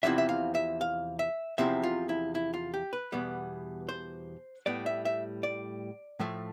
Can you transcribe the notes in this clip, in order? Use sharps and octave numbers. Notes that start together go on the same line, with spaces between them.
E2 C3 F3 C4 E4 E5
E5
F5
E5
F5
E5
E2 C3 F3 C4 E4 E5
F4
E4
E4
F4
G4
B4
E2 B2 G3 B3
C5
A2 G3 B3 D5
E5
E5
D5
A2 F3 A3